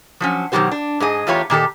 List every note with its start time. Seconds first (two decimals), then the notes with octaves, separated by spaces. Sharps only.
0.20 F3 F#3 C#4
0.52 B2 D#3 F#3 F#4 G4 C5
0.72 D4
1.00 G#2 G#4 D#5
1.27 E2 A3 F4 G4 C#5 A#5
1.50 A#2 D#3 G4 A4